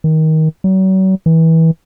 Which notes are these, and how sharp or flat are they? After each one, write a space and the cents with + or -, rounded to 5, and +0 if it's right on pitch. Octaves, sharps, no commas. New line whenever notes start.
D#3 +20
F#3 +40
E3 -25